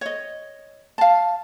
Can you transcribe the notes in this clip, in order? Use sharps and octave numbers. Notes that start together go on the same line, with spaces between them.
C#5 D#5
F5 A5